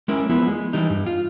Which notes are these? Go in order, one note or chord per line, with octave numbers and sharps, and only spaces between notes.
G#3 C#4 E4 A#4
F3 B3 E4
G#3
E3 G3 D#4
G2
F4